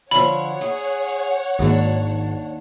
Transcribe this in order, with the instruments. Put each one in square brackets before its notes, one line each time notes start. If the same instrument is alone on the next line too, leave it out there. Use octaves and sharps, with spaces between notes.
[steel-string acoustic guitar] D3 F3 [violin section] C#5 F#5 [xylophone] B5
[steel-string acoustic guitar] G#4
[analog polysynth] G#1 [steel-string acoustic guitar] D#2 D4